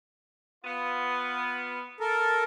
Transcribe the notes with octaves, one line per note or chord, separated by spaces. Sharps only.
B3 F4
A4 A#4